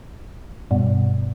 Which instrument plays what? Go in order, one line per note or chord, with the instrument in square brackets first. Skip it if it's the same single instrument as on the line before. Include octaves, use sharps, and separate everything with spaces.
[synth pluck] G2 B2